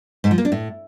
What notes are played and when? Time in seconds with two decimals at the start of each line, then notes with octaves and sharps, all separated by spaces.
0.24 G#2
0.31 F3
0.38 A#3
0.45 D4
0.52 A2